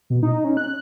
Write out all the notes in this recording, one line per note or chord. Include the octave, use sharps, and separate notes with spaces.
B2
D#4
C#4
F#6